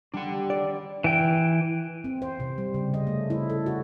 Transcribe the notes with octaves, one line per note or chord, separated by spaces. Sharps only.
G3 D4 F#5
D5
E3 G5
C4
C5
C3
G3
C#3
D#5
A3
E4
A4
F#4